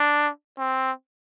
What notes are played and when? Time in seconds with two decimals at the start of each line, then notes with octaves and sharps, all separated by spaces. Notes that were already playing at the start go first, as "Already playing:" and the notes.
Already playing: D4
0.58 C4